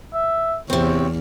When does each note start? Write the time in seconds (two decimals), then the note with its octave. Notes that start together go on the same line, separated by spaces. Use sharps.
0.14 E5
0.70 E2 C3 C4 C#5